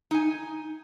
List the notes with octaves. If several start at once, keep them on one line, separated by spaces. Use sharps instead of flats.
D#4 G#5